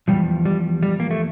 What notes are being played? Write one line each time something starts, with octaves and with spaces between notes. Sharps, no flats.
E2 C3 F3 G3
G3
G3
A#3
A3